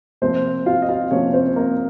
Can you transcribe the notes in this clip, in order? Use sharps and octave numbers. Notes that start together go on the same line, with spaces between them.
C3 F3 A#3 C4 C5
F4 F5
D#5
F4 F5
C3 F3 A#3 C#4 C#5
C4 C5
A#3 A#4